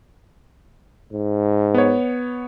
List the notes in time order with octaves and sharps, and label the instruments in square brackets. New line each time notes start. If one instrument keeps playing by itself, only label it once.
[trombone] G#2
[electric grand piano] B3 C#5